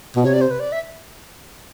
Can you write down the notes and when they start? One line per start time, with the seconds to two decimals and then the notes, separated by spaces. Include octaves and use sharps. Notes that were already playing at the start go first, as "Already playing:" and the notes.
0.16 B2
0.24 C3 C#5
0.33 D5
0.41 C5
0.51 B4
0.60 D5
0.72 E5